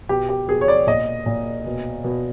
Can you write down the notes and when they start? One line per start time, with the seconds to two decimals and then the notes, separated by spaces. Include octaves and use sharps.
0.09 B2 G4
0.29 G4
0.48 B2 G#4
0.61 C#5
0.68 D5
0.87 A#2 D#5
1.26 A#2
1.66 B2
2.04 B2